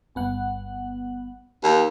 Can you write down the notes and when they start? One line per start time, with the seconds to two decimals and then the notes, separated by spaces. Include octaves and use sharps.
0.15 G1 B3 F#5
1.64 D#2